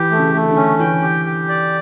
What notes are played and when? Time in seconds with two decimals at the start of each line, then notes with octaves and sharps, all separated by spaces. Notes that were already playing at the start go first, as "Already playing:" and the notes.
Already playing: E3 G4
0.11 A3
0.19 C#3
0.34 A3
0.43 C#3
0.49 D3
0.56 C#4
0.79 E3 G5
1.02 G4
1.25 G4
1.49 D5